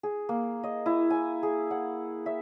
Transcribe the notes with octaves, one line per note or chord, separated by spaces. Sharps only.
G#4
A#3
D#5
E4
G#5
G#4
F#5
E5